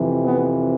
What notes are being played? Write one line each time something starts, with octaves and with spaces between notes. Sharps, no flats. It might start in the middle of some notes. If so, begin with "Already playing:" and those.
Already playing: F2 C3 E3
B3